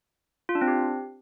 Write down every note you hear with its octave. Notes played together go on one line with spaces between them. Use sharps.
F4
D4
C4
G4